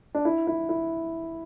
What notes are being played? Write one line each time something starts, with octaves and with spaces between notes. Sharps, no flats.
D4
E4
E4
E4